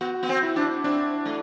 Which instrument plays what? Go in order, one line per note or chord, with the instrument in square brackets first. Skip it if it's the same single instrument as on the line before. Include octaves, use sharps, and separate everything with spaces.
[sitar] B3 [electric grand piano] F#4
[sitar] B3
C4
[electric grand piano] E4
[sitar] D4
[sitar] C4 [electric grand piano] D4
[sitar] A3